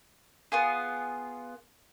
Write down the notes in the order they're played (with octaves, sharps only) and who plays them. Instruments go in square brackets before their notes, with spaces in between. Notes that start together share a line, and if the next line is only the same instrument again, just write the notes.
[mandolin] B3 F4 G#4